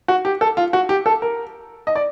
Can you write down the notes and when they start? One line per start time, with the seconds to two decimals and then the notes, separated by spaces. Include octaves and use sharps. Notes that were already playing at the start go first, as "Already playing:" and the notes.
0.08 F#4
0.25 G4
0.41 A4
0.57 F4
0.73 F#4
0.89 G4
1.06 A4
1.22 A#4
1.87 D#5
1.96 D5